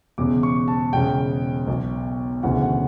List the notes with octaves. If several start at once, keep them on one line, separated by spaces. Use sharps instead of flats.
E1 E2 C#3 D6
C#6
A5
E1 E2 C#3 G5
B1 B2
E1 D2 C#3 E3 F#5
F#5